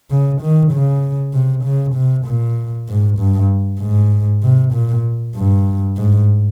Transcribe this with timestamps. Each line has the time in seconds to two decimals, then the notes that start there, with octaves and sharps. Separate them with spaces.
0.10 C#3
0.41 D#3
0.72 C#3
1.33 C3
1.65 C#3
1.95 C3
2.26 A#2
2.88 G#2
3.18 G2
3.81 G#2
4.43 C3
4.73 A#2
5.35 G2
5.97 G#2